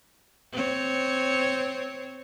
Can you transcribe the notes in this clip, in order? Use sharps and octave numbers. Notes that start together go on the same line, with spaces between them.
C4 C#5